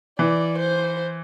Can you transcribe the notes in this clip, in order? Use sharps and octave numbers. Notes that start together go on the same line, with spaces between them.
E3 D5
C5